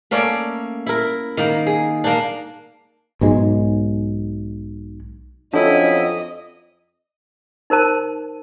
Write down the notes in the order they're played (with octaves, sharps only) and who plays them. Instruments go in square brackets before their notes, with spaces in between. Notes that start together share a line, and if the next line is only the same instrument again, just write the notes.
[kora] A3 A#3 C#4 D5
E4 A#4
D#3 A#3
G#4
A#3 D4
[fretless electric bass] B1 G#2 G#3
[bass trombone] F2 [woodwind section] F#3 C#4 E4 [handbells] D4 A4 E5 [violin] D#5
[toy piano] D#4 A#4 C5 A5